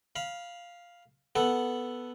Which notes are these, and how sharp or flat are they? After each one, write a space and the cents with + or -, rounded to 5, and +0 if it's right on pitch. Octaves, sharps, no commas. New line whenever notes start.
F5 +0 B5 -25
B3 +0 A4 +0 F#5 +0